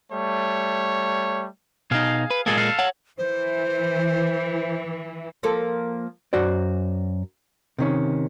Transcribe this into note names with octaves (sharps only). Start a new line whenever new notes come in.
G3 A3 C#5
B2 D#4 G#4 F5
B4
B1 A#2 G#3 A#3 G#4 A4
A4 F5
C#5 F#5
E3 C5
F3 A#3 A4
F#2 F#4 C5 D5
C3 D#3 C#4